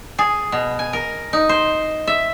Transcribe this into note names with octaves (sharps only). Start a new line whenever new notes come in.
G#4
B2
G#5
A#4
D#4
C5
E5